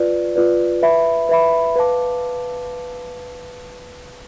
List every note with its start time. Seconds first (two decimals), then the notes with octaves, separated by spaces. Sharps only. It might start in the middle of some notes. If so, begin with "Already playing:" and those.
Already playing: F4 B4 D5
0.36 F4 B4 D5
0.82 B4 E5 B5
1.29 B4 E5 B5
1.76 B4 F5 A5 D6